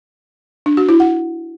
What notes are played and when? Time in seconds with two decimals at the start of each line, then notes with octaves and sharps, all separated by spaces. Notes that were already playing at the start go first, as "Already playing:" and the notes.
0.66 D4
0.77 F#4
0.89 E4
1.00 F#5